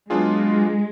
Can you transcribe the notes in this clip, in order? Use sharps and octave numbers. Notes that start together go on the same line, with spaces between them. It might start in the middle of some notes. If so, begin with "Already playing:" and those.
F#3 G#3 B3 D4 F4 G#4